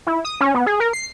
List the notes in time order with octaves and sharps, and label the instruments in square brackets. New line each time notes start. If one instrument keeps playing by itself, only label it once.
[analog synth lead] E4
D#6
C#4
B3
G#4
A#4
C7